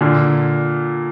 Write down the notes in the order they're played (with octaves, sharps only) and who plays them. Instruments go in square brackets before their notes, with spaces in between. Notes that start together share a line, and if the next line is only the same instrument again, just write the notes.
[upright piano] A#2 D3